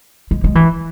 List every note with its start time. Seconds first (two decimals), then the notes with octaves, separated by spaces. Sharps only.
0.31 G#3
0.44 G#3
0.55 E3